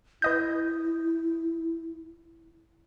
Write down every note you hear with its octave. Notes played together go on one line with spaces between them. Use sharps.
E4 B4 D#5 G6